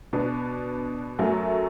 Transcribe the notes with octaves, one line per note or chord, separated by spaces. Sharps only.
B2 B3 D4
F#2 F#3 A3